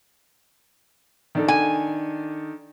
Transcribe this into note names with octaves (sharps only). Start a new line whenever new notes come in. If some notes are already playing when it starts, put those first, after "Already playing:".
D#3 D4 A4
G#5